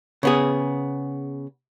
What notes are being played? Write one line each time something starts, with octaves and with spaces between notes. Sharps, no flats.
C#3 B3 G#4